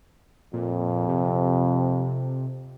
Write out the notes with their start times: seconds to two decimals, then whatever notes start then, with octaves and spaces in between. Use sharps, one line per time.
0.53 F2 A#2
1.08 C3